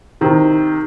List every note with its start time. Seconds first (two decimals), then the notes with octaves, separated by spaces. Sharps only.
0.21 C3 D#3